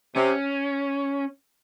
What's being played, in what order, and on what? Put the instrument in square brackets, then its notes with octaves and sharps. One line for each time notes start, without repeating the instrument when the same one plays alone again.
[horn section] C3 [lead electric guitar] C#4